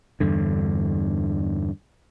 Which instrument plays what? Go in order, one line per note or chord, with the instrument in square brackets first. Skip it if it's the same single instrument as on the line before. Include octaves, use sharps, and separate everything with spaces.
[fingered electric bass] E2 G2 D3